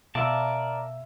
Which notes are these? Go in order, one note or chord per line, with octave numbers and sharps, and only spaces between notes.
B2 A#4 D5 E5 F5 A5 E6